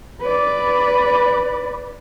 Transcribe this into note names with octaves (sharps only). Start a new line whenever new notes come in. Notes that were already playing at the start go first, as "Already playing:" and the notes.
B4 D5